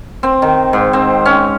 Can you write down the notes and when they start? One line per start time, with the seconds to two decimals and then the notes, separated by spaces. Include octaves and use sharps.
0.23 C4
0.42 D#3
0.73 G#2
0.93 C4
1.25 C#4